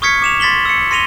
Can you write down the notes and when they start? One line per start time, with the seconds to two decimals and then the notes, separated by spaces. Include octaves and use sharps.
0.02 C#6 D#6 F6 G#6 B6 C#7
0.22 D6 E7 F7
0.40 C6 A6 B6 F#7 G7
0.65 E6 C#7
0.91 C6 A#6 D#7 F7 G7